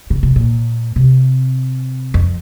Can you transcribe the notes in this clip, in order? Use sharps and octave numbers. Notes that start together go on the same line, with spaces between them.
C#3
C3
A#2
C3
F2